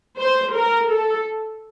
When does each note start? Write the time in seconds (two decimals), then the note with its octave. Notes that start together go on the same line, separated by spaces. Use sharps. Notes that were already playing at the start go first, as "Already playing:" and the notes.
0.18 C5
0.55 A#4
0.90 A4